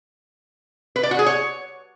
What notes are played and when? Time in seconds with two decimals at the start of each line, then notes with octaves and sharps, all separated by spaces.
0.96 B4
1.03 D5
1.11 F#4
1.19 G#4
1.26 C#5